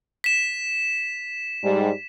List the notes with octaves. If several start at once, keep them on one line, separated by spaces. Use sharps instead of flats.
B6 E7
G#2 G3